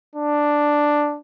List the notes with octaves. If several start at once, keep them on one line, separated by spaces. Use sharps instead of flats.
D4